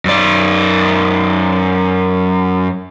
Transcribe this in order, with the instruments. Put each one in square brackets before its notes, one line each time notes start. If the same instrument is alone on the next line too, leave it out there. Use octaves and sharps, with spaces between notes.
[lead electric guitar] F#2 D5